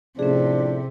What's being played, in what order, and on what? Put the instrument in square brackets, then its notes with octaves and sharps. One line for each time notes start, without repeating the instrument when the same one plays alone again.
[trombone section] A2 F3 A3 [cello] C3 [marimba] C#4 G#4 [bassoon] D4